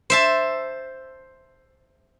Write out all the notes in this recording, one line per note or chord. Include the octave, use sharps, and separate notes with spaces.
C5 E5 A5